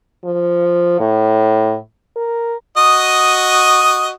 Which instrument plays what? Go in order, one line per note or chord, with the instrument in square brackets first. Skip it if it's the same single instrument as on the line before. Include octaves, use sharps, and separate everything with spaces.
[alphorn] F3
A2
A#4
[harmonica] F#4 D#5 D#6